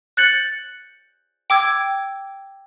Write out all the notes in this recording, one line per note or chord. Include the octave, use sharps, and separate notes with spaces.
F#6 G6 A6 C#7 F#7
G5 D6 E6 G#6